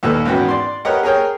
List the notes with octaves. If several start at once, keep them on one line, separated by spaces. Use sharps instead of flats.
D#2 A#2 A4 B4 F6
G#1 E2 B3 C#4 F#4 G5
D5 C6
G4 A#4 B4 C#5 D#5 F#5
G#4 A#4 C#5 G5